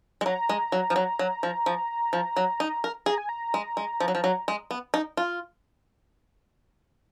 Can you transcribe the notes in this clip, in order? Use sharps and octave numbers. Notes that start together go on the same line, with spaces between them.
G#3
F#3 A#5
G#3
F#3
F3
F#3
F#3
F3
F3
F3
F#3
D#4
A#4
G#4 A#5
G#5
A#5
G#3
G#3
F3
F#3
F3
F#3
G#3
B3
D#4
F4